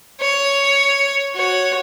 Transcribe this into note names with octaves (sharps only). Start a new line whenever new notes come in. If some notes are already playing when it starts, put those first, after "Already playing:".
C#5
F#4 C#5